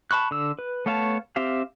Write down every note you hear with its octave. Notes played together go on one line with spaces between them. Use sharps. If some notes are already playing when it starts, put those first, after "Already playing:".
A5 B5 C#6 F#6
D3 E6
B4
A3 B3 C#5 F5 A5
C4 G4 E5 F5